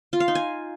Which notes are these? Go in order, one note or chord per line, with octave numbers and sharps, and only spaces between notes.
F4
F5
D#4
G#5